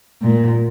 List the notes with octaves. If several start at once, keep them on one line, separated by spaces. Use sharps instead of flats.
A#2